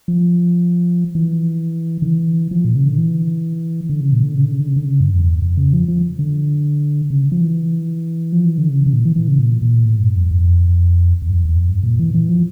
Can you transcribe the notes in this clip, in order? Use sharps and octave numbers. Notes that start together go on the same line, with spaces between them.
F3
E3
D3
E3
F3
A#2
C#3
D3
E3
D3
C#3
A#2
D3
C#3
D3
C#3
D3
C#3
D3
C#3
G2
F2
E2
F2
C#3
F3
F3
D3
C#3
F3
E3
F3
E3
D3
C#3
C#3
A#2
E3
E3
C#3
A#2
A#2
A2
G2
F2
F2
E2
G2
F2
E2
F2
G2
A#2
E3
E3
F3